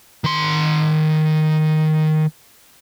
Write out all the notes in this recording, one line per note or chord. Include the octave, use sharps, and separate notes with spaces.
D#3 C6